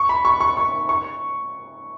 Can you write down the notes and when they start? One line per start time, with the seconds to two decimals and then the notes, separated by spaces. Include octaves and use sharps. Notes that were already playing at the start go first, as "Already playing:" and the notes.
Already playing: C#6
0.09 B5
0.25 C#6
0.40 C#6
0.57 C#6
0.89 C#6